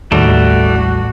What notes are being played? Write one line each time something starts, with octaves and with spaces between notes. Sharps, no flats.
A1 D#2 G3 A3 F#4